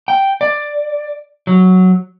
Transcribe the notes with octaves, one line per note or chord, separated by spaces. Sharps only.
G5
D5
F#3